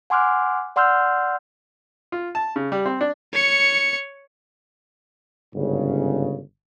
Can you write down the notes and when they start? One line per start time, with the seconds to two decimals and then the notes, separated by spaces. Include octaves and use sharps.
0.10 F#5 G#5 C6 D6 F6 F#6
0.76 D5 F#5 C6 E6 F6 G6
2.12 F4
2.35 A5
2.56 C#3
2.72 G3
2.86 C4
3.01 D4
3.33 C#5 C#7
5.55 G1 G#2 C#3